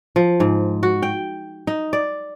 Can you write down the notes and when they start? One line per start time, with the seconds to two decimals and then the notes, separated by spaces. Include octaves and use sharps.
0.16 F3
0.40 G#2
0.83 F#4
1.02 G5
1.67 D#4
1.93 D5